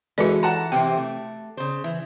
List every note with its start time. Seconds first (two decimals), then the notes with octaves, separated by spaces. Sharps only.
0.18 E3 G#3 F#4 A4 B4 D5
0.43 F#5 A5 A#5
0.72 C3 E3 C4 G5
0.97 A3
1.57 C#3 C5
1.84 E3